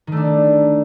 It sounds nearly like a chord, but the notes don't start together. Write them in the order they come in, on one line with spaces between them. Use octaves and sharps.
D#3 A3 D4